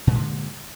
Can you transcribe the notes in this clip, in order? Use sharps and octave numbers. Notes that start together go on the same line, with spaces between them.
G2 A#2 D3 G#3